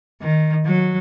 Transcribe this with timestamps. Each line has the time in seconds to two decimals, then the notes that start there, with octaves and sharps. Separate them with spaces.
0.22 D#3
0.66 F#3